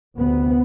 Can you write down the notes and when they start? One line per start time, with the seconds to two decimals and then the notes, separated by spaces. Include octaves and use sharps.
0.18 D2 C3 B3